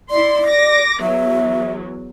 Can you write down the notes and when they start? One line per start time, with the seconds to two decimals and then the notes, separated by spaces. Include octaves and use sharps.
0.10 E4 D5 C6
0.47 D6 A#6
1.01 E2 F#3 E5